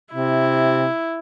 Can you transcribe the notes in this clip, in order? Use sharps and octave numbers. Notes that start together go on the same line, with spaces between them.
C3 E4